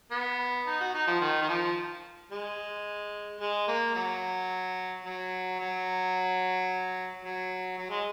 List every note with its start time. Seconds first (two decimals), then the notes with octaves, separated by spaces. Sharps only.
0.11 B3
0.67 D#4
0.81 F#4
0.94 D#4
1.07 F3
1.21 D#3
1.42 D#3
1.49 F3
2.31 G#3
3.40 G#3
3.68 A#3
3.96 F#3
5.05 F#3
5.60 F#3
7.25 F#3
7.78 F#3
7.90 G#3